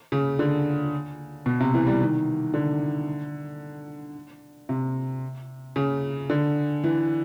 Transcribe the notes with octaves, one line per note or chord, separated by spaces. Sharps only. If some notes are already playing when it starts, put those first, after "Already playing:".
C#3
D3
B2
C3
E3
G3
D#3
D3
C3
C#3
D3
E3